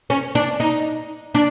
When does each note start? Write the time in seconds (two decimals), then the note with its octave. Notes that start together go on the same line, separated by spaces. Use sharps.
0.10 C#4
0.35 D4
0.60 D#4
1.35 D4